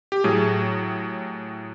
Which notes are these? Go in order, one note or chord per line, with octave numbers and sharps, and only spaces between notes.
G4
A2 F#3 G#4